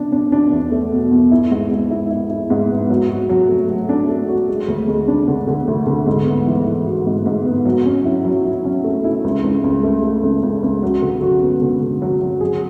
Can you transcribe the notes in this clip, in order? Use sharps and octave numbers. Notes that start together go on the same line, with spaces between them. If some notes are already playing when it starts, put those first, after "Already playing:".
Already playing: B2 D4
D4
D4
E2
A3
B2
E2
E4
G#2
G#2
E4
E4
E4
G#2
B3
F#3
F#4
F#3
A3
A3
D4
A3
F#4
G#3
D2
G#3
D4
D3
D3
D2
D3
G#2
B3
E3
E3
F#4
G#2
G#2
B3
F#3
C#4
E4
F#3
E4
C#4
A3
E4
C#2
C#2
C#2
A3
A3
C#2
C#2
C#2
F#3
D3
F#4
B3
D3
D3
F#3
F#3
G#4